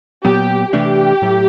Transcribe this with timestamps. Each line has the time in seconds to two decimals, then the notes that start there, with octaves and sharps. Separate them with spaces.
0.24 A#2 F#3 B3 G4
0.73 C3 E3 A3 D4 G4
1.22 A2 F#3 A3